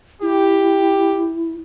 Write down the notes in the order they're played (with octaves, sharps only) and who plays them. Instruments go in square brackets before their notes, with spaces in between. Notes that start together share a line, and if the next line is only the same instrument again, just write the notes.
[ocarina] E4 [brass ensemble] G4